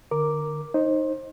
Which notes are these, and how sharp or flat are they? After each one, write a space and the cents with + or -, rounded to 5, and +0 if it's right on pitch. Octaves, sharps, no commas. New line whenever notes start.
D3 +30 A#4 +0 D6 +0
D#4 +0 C5 +30